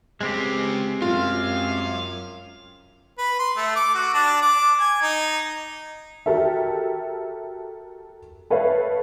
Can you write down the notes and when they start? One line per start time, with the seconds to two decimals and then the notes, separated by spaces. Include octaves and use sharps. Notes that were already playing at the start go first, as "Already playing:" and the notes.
0.21 C#2 C#3 G#3 C4 G4
1.02 F#2 F4 F5
3.18 B4
3.39 C6
3.57 A3
3.76 D6
3.95 F#4
4.14 D4
4.42 D6
4.80 G#5
5.02 D#4
6.26 F#4 G4 A4 A#4 E5
8.50 A4 B4 C#5 E5 F5